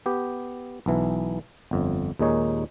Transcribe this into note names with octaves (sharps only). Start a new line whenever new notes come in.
B3 G4
B1 E3
G1 F2
D#2 A#2 G#3 D#4 C#5